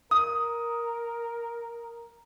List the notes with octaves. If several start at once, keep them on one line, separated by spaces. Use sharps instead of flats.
A#4 D#6